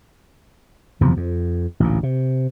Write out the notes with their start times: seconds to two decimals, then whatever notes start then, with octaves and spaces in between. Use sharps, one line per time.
1.01 F#1 E2 C3 F3
1.17 F2
1.80 A1 D2 A#2
2.03 C3